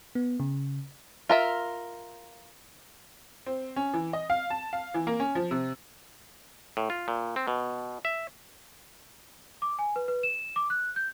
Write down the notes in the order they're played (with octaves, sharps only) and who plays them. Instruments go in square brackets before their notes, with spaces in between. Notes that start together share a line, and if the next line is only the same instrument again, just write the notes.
[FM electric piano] B3
C#3
[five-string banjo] F4 A#4 E5
[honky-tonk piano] C4
C#4
E3
D#5
F5
A5
F5
E3
A#3
C#4
F3
C3
[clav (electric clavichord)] A2
F4
A#2
C4
B2
E5
[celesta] D6
G#5
B4
B4
E7
D6
F#6
G6